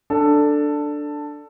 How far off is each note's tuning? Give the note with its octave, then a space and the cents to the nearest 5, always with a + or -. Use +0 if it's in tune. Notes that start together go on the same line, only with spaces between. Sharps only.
D4 +5 A4 +10